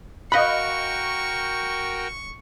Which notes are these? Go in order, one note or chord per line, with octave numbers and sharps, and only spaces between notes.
F#4 A#4 D#5 F5 G5 B5 C#6 F#6